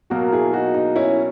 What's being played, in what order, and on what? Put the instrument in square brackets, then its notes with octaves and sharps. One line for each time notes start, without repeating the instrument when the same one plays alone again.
[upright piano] B2 F#3 A#3 [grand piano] F#4 A#4
[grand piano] E4 G#4
D#4 F#4
D#4
C#4 E4